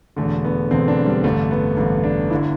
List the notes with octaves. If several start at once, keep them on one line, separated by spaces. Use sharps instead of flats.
E1 E2 D3 A3
B3
E1 E2 D3 C4
D4
G3
A1 G2 D3 A3
B3
A1 G2 D3
D4
G1 D3 E4